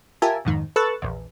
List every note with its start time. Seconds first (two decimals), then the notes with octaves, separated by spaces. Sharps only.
0.22 F4 G4 A#4 E5 G#5 A5
0.45 A1 F2 G#2 D#3
0.76 A4 B4 C#6 E6 F#6 A6
1.02 A#1 E2